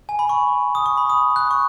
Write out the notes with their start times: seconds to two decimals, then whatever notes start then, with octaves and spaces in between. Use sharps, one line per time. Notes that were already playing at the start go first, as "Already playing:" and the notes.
0.09 G#5
0.19 B5
0.29 C#6
0.75 D#6
0.86 C#6
0.97 B5
1.10 D#6
1.36 F#6
1.51 C#6